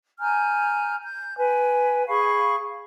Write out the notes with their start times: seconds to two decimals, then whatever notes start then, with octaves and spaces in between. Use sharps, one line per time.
0.20 G#5 A#5 F6 G6
1.04 G6
1.38 B4 G5 G#5
2.08 G#4 F5 B5 C#6